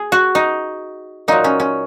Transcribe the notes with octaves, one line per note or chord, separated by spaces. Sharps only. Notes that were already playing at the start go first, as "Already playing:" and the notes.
Already playing: G#4
F#4
D#4
A#2 F#3 D#4
C#4
C#4